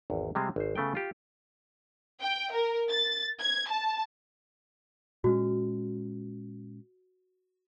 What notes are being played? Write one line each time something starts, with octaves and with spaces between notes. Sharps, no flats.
G#1 E2
C3 G3 G#3 C4
G#1 C5
C#3 A3 B3 G5
F4 G4
G5
A#4
A6
G#6
A5
A#2 G#3 C#4 F#4